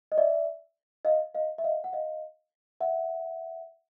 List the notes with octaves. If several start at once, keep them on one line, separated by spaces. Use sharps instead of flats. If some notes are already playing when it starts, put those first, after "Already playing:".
D#5
D5 E5
D#5 F5
D#5 F5
E5
D#5 F5
F#5
D#5 F5
E5 F#5